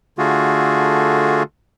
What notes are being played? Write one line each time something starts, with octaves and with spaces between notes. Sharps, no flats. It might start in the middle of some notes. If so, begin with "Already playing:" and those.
D3 A3 F4 F#4 G#4